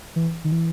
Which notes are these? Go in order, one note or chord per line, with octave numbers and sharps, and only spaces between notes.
E3
D#3
E3